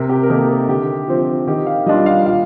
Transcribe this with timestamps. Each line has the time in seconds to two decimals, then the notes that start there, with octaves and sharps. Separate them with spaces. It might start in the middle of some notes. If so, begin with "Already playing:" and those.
Already playing: C3 A#4
0.09 G4
0.23 A#4
0.29 D#3 A#3 D#4 A4
0.49 A4
0.68 D3 G4
1.08 F3 C4
1.48 D#3 G4
1.67 F5
1.86 G3 D4 F4 D#5
2.06 F5
2.26 A#2 F5